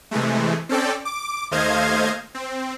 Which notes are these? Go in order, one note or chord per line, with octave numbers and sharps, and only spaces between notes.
C3 E3 G#3 A3
C4 C#4 A4 D5 G5
D6
D#2 A3 C5 D#5 F5 G#6
C4